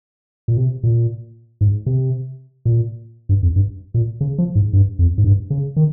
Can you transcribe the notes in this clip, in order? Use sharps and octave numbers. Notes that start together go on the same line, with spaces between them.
A#2
C3
A#2
G#2
C3
A#2
G2
F2
G2
A#2
C#3
F3
G#2
G2
F2
G#2
G2
C#3
D#3